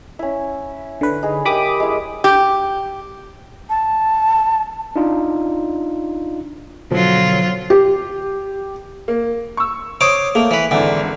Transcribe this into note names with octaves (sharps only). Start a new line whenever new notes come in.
C#4 E4
D3 B4
D#4 G#4
G4 A#4 E5 B5 D6 D#6
G#3 E4
G4
A5
D4 D#4 F4
B2 D3 F3 F#3 F4
G4
A#3
C#6 E6
C5 C#5 D6 D#6
A3 A#3
E3 B4
G#1 D3 E3